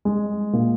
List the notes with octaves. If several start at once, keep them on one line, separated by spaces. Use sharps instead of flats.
G#3
A#2